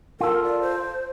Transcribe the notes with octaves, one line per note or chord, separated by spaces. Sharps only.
F4 A4 A#4
D5
C5